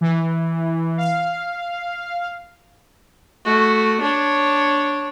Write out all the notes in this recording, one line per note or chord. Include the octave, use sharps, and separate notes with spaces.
E3
F5
A3 F#4
D4 C#5